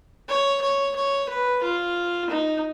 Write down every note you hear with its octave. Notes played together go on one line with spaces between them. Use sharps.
C#5
C#5
C#5
B4
F4
D#4